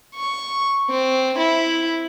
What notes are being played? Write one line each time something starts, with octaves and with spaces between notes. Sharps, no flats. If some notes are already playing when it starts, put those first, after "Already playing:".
C#6
C4
E4